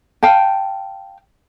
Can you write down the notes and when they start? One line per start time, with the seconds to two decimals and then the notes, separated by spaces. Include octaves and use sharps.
0.23 F5 G5 A5